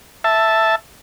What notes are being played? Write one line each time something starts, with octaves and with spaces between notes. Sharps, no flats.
E5 A5